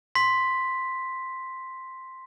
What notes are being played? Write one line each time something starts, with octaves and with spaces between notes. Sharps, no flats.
C6 B6